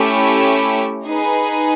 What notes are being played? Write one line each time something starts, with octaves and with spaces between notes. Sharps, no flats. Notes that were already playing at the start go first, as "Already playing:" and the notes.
Already playing: A3 C#4 E4 G4
D#4 G#4 B4